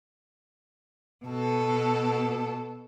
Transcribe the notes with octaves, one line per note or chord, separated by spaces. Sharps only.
B2 A4